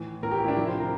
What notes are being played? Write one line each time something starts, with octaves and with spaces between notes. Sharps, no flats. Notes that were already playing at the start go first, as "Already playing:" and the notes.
Already playing: A2 E3
A2 E3 G4 A#4
E4
D4
C3 F3 E4
C5
A#4